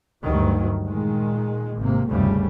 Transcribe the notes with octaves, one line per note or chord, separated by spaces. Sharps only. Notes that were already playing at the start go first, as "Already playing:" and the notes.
D2 G2 D#3 F#3 G3
A#2 D#3 G#3
G#1 C3 A#3
F1 D2 G2 C#3 G3 A3